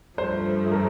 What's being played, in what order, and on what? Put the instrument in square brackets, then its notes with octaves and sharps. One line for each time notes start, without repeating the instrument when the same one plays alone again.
[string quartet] G2 F3 A3 [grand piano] C5
[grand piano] A#4